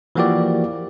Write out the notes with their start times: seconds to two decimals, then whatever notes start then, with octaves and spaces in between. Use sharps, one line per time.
0.15 E3 F3 A#3 F#4 G4 D5